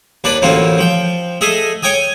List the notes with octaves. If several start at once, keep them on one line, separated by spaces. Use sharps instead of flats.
D#2 D4 B4 D5
A1 D2 A#3 C4 C#4 F4
F3 G5
A3 G#4 D#5 E5
C#5 G5 G#5 D#6